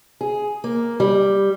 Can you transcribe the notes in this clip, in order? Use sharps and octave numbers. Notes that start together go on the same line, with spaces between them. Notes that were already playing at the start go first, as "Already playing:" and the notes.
G#4
A#3
G3